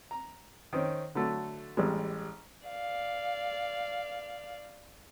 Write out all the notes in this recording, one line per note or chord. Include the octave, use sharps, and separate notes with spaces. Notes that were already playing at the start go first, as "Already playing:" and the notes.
A#5
D#3 C4 C#4
D3 F#3 A3
A1 G3 G#3
D5 F5